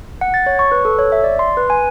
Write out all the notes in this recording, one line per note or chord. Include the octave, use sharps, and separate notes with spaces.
F#5
A6
C#5
C#6
B4
A4
C#5
E5
D5
C6
B4
G#5